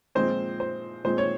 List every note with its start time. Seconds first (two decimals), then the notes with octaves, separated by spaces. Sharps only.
0.15 A#2 F3 G#3 C4 C5
0.60 C5
1.04 A#2 G#3 C4 C5
1.18 C#5